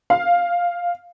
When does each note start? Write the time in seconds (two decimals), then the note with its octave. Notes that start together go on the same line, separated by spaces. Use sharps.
0.10 F5